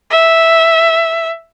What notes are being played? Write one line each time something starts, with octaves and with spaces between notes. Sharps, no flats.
E5